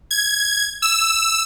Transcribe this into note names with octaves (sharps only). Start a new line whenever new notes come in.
G#6
E6